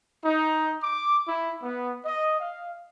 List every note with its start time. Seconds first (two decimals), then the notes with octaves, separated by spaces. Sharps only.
0.24 D#4
0.83 D6
1.28 E4
1.63 B3
2.05 D#5
2.41 F5